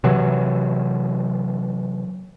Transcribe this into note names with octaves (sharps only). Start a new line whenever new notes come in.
C3 E3 F#3